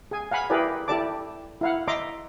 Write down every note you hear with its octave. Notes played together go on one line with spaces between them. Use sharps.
G#4 G#5
F5 F#5 G#5 B5
E4 G4 G#4 A#4 B4 D5
E4 G4 A4 D5 A5 D6
E4 F5 F#5
D#5 E5 A#5 C6 D6